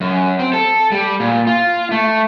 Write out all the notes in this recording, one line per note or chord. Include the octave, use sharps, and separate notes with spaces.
F#2
C4
A4
G3
A#2
F4
A3